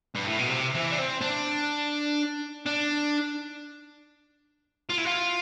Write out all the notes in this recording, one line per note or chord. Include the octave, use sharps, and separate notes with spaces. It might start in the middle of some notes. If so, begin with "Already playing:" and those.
G2
A2
B2
C3
E3
D4
C4
D4
D4
F4
E4
F4